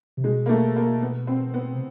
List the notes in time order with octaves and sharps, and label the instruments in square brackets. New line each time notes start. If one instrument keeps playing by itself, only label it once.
[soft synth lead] C3
[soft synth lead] B2 [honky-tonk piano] G#3
[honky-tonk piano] A#3
A3
A#3
B3
C4
B3
[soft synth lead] C3